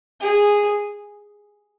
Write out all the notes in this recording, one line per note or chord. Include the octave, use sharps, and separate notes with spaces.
G#4